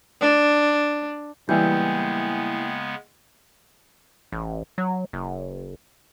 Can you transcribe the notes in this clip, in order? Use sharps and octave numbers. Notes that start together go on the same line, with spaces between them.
D4
C#3 E3 G3 G#3 A#3 B3 G5 G6
A1
F#3
F#1